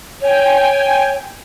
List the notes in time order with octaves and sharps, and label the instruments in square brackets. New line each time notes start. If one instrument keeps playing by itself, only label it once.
[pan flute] C#5 [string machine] G5 G#5